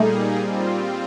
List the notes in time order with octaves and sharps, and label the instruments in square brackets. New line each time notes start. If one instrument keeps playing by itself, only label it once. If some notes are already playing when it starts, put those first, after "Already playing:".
Already playing: [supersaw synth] A#2 G3 A#3 D#4 G#4 [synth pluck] A3
[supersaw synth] G3 C4 F4